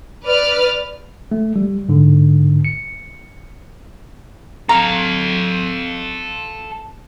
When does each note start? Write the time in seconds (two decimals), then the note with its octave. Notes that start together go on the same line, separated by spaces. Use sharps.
0.25 B4 D5 F6
1.31 A3
1.56 G3
1.89 G#2 D3
2.65 C#7
4.69 A4 F5 A#5